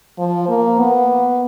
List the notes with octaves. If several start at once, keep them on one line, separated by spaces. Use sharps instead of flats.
F3
A#3
B3